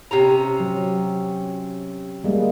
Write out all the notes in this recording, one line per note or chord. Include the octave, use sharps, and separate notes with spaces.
C3 C#4 A#5
F#3
G3 G#3 A#3